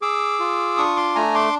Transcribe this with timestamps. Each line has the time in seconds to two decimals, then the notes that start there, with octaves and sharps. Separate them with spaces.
0.02 G#4 D6 E6
0.40 F4
0.77 D4 C#6 D#6
0.96 C6 D6
1.15 A3 G#5 A#5
1.35 C6 D6